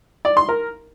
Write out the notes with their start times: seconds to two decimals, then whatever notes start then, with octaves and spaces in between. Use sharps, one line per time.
0.25 D5
0.37 C6
0.49 A#4